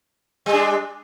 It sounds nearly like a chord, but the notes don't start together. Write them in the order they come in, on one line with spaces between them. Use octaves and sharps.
G3 G#3 D4